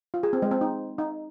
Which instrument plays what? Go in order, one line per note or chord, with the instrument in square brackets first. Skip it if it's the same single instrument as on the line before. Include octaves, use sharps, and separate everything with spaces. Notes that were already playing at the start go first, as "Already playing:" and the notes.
[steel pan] F4
G#4
C4
G#3
C4
D#4
D#4